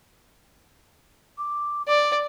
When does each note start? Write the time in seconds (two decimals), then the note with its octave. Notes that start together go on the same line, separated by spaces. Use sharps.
1.38 D6
1.87 D5 D6